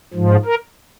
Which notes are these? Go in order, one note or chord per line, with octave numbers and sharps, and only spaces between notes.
G#2 F3
A#4